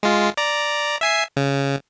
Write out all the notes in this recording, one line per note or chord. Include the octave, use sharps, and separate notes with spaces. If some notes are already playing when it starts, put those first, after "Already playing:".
G#3 F4
D5 A#5
E5 G#5 C7
C#3